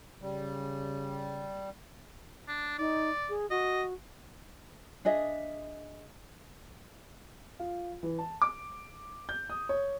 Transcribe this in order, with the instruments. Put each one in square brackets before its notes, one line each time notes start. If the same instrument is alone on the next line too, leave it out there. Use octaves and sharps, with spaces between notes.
[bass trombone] C#3 [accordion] G3
[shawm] D4
[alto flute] D#4 [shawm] D5
[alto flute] G#4
[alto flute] F#4 [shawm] D#5
[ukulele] D4 G#4 D#5 E5
[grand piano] F4
E3
A5
D6
G6
D#6
C#5